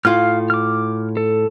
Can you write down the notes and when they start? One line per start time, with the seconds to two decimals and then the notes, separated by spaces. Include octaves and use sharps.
0.05 A2 F4 F5 F6
0.50 D6 F6
1.17 A4